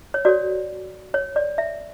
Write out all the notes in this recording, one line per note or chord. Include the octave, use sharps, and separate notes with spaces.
C#5
F#4 A4 C#5 D5
C#5
D5
E5